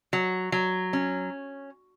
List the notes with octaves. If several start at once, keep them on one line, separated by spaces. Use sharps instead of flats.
F#3
F#3
C#4